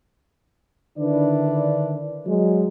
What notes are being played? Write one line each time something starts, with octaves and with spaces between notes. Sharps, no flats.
D3 D#3 D4 E4 B4 D5
F#3 G#3